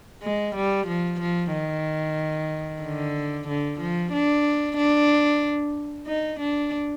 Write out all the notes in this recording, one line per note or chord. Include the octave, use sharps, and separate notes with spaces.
G#3
G3
F3
F3
D#3
D3
D3
F3
D4
D4
D#4
D4